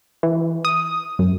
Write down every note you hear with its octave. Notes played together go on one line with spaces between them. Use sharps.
E3
D#6
F#2